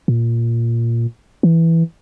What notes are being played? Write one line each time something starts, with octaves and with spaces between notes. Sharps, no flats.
A#2
E3